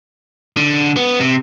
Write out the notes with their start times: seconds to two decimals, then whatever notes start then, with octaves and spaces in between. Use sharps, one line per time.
0.57 D3
0.96 B3
1.20 C3